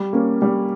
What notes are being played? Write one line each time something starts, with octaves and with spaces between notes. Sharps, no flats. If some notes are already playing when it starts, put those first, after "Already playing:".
Already playing: G3
A#3 C#4
G3